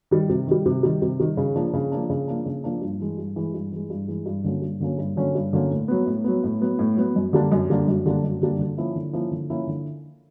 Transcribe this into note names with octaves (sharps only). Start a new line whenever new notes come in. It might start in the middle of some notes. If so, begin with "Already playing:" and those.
D#3 G3
C3
D#3 G3
C3
D#3 G3
C3
D#3 G3
C#3
F3 A#3 D4
C#3
F3 A#3 D4
C#3
F3 A#3 D4
C#3
F3 A#3 D4
G2
E3 G#3
G2
E3 G#3
G2
E3 G#3
G2
E3 G#3
G2
D3 F#3 A#3 C#4
G2
D3 F#3 A#3 C#4
G2
D3 F#3 A#3 C#4
G2
D3 F#3 A#3 C#4
A2
F#3 B3
A2
F#3 B3
A2
F#3 B3
A2
F#3 B3
F#2
D3 G3 A#3 D4
F#2
D3 G3 A#3 D4
F#2
D3 G3 A#3 D4
F#2
D3 G3 A#3 D4
D3
F3 A#3 C#4 E4
D3
F3 A#3 C#4 E4
D3
F3 A#3 C#4 E4
D3